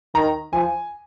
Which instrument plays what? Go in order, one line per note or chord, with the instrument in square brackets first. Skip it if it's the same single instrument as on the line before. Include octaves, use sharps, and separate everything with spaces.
[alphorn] D#3 [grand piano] A#5
[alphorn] F3 [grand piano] G#5